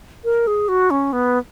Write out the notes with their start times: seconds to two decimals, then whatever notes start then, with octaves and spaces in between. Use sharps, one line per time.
0.24 A#4
0.47 G#4
0.68 F#4
0.90 C#4
1.13 B3